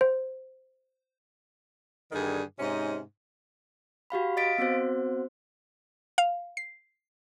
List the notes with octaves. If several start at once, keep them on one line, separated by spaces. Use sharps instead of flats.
C5
G2 D3 D#3 G#4
G#2 C3 C#4 D#4
F#4 G4 F5 B5
D#5 F5 A6 B6 D7
B3 C4 F#4 C5
F5
C7